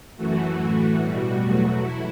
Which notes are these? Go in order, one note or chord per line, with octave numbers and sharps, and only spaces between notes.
F#2 E3 A3 F#4
A2 E3 A3
B2 G3 F#4
E2 B2 F#3 A3
E4